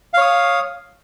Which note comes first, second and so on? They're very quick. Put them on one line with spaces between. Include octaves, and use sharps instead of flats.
F5 C#5 D#6